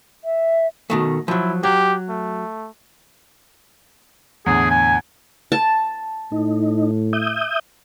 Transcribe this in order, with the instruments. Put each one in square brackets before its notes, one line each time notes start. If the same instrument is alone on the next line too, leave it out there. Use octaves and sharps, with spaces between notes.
[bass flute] E5
[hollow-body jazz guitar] B2 D#3 A3
[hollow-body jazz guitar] F3 F#3 [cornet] E4
[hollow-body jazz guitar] F#3 [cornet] G4
[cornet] A3
[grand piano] E2 A2 D3 [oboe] G#4
[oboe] G#5
[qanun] A5
[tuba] A2 [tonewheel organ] D#4
[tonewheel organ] E5 D#6 G6